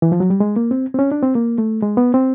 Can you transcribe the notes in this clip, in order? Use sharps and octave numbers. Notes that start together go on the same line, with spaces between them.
E3
F3
F#3
G3
G#3
A#3
C4
C4
C#4
D4
C4
A#3
A3
G#3
B3
C4